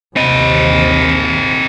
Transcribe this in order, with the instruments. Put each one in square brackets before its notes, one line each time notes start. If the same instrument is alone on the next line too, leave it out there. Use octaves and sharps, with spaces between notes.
[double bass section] A#1 D#2 C3 [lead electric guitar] C4 D#5